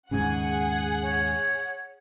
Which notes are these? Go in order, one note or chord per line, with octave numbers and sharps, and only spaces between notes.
D#2 G#2 C#3 G#4 F#5 G#5
C#5